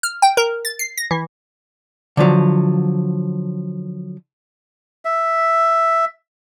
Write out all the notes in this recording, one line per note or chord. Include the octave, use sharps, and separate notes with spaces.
F6
G5
A#4
A6
C7
A#6
E3
D3 F3 F#3
E5